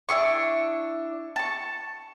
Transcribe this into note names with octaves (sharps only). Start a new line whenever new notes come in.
D4 E4 G#4 C#6
A5 C#6